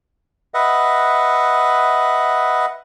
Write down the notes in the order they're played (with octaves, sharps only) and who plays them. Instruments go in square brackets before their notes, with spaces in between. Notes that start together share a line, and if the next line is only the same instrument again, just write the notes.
[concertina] B4 D#5 E5 F#5